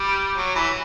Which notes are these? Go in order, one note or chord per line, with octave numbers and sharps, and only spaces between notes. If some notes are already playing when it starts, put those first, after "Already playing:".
Already playing: G3
F#3
E3